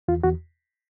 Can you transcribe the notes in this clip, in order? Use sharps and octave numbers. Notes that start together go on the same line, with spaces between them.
E2 F4
E2 F#4